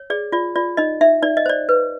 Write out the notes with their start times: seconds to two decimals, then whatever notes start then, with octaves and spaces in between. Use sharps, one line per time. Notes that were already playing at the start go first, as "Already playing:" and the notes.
Already playing: C#5
0.10 G#4 D5
0.32 F4 D5
0.56 F4 D5
0.77 D#4 D#5
1.01 D#4 E5
1.22 D#4 D5
1.37 D#5
1.46 C5 D5
1.69 B4